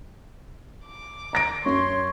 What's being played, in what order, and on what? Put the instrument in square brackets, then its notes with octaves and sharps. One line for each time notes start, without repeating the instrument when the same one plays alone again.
[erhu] D6
[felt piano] A#5 A#6 D7
[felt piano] F#2 [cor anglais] C#5 [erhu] C6